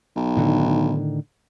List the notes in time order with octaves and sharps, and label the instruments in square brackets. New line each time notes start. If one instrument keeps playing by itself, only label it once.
[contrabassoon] B1
[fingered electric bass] A2 D3 D#3